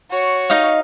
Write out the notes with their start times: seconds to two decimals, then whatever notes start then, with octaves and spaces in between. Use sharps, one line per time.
0.11 F#4 C#5
0.50 D#4 D#5 F5